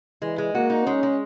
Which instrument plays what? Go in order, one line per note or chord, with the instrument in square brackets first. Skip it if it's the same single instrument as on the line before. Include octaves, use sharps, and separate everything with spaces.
[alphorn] E3 [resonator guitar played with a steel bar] G#3
[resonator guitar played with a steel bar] G#3
[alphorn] A#3 [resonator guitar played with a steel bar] F#4
[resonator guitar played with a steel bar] D#4
[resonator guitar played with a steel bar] G#3 [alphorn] C#4
[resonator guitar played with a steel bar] G#3